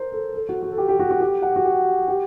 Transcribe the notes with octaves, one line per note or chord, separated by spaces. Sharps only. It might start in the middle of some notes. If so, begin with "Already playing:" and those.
Already playing: A#4 C5
A4
A4
F#4
F#4
A4
G4
G4
F#4
F#4
G4
F#5
F#4
G4
G4